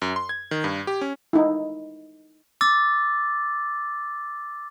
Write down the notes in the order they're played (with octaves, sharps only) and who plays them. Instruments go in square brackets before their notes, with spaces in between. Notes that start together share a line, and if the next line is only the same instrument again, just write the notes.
[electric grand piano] F#2
C6
G#6
D#3
G2
G4
C#4
[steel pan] D#4 E4
[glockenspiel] D6 E6 A6